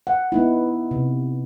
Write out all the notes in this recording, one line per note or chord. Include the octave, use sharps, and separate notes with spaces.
F#5
B3 D#4 E4
C3